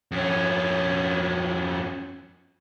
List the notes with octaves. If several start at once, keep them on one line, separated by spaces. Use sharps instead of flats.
F2 C#4